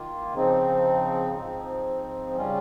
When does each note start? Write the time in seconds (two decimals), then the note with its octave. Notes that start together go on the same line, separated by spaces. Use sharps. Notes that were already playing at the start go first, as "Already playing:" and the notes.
Already playing: D#3 A#3 F4
0.34 C#3 F3 C4 D#4
1.35 G#2 F3 C4 D#4
2.37 C#3 G3 C#4 F4